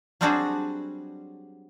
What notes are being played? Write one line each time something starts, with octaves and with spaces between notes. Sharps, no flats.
F#3 G3 C4 D4 F#4 G#4